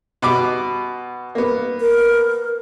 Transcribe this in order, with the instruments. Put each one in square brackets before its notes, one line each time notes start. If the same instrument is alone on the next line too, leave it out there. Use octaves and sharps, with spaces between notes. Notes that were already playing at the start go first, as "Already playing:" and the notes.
[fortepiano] B2 B5 D6
A#3 B3
[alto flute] A#4